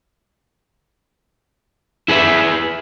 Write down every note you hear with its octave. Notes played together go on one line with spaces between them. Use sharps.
E4 G#4 B4 E5